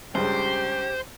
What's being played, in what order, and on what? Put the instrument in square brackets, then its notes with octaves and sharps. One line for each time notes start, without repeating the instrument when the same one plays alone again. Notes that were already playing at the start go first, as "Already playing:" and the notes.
[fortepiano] C#2 G2 C#3 [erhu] G4 [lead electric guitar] C5